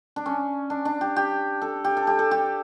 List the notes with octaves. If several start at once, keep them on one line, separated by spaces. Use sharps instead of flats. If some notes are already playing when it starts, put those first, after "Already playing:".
D4
C#4
D4
D4
G4
G4
A4
G4
A4
G4
A4
G4